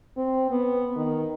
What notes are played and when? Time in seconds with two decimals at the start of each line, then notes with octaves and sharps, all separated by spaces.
0.17 C4
0.51 B3
0.96 D#3